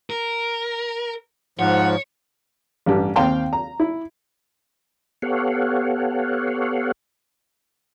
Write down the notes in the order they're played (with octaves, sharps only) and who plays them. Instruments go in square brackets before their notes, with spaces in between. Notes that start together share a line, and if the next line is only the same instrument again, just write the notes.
[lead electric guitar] A#4
[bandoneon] G#2 F3 [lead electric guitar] C#5 [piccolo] F#5
[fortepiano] A1 G2 G4
D#2 C4 F5 G5 C6
A#5
E4
[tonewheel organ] B3 G4 A4 C#5 F5 F#5